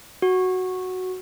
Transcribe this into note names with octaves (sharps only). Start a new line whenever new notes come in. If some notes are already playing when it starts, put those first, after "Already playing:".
F#4